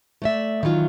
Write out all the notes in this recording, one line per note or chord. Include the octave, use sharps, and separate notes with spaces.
A3 D5 E5
D#3 E3 F#3 F4